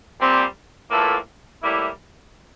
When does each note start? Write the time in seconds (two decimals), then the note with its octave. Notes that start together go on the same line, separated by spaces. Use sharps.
0.18 A#2 G3 C4
0.90 A2 E3 A#3 F4 A4
1.62 A2 G3 A#3 E4